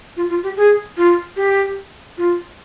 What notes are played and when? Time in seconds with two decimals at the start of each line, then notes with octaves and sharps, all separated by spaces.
0.17 F4
0.30 F4
0.43 G4
0.57 G#4
0.97 F4
1.37 G4
2.18 F4